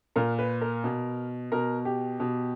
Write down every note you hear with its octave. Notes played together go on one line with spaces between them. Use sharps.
A#2 A#4
B4
A#4
B2
B2 A#4
G4
B2